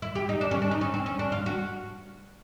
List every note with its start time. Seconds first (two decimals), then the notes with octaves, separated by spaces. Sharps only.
0.02 E4
0.15 G4
0.29 D#4
0.41 D4
0.51 C#4
0.62 D4
0.71 D#4
0.81 C#4
0.94 C4
1.06 C#4
1.19 D4
1.32 F4
1.46 F#4